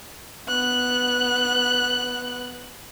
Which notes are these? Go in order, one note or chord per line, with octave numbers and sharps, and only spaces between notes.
B3 F#6